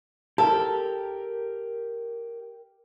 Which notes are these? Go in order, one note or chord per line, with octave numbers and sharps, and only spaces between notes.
G4 A4 A#4